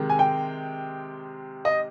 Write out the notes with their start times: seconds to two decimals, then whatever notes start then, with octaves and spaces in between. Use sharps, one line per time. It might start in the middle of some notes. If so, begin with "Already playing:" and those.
Already playing: C3 D#3 G#3
0.10 G#5
0.19 G5
1.65 D#5